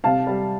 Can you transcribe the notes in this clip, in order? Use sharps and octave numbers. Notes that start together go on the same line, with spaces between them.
C3 F5 A5
G3